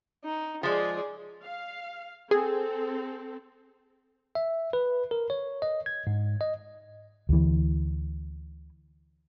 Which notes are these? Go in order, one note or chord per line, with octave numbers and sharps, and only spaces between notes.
D#4
F3 G#3 G#4 D5
F5
C4 G#4 A4
E5
B4
A#4
C#5
D#5
G#6
G#2
D#5
D2 E3